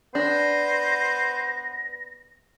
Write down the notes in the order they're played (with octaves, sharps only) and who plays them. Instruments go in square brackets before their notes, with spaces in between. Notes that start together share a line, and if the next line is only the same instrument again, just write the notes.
[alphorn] B3 [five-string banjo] D4 [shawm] C5 [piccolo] A#6